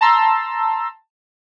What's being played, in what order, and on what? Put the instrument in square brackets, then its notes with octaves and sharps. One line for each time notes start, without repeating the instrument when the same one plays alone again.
[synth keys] A5 A#5 C6 E6